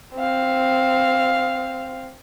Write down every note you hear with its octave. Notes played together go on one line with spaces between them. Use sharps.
C4 F5